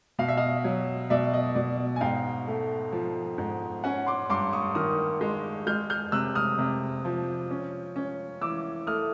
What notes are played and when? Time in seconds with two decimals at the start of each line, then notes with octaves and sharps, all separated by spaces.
0.19 B2 F5
0.28 E5
0.37 D#5 F5
0.64 F#3
1.10 B2 D5 E5
1.34 D#5
1.55 B2 D5
1.96 G#5
2.01 G#2 F5 G5
2.47 A3
2.92 F3
3.38 G#2
3.84 C#4 F#5 G#5
4.07 C6 D6
4.30 G2 C6 D6
4.53 C#6 D#6
4.75 D#3 D#6 F6
5.21 G#3
5.67 G#3 F6 G6
5.90 F6 G6
6.12 C3 E6 F#6
6.35 D#6 F6
6.59 C3
7.05 F3
7.51 C#4
7.96 C#4
8.41 E3 D6 E6
8.87 A3 D#6 F6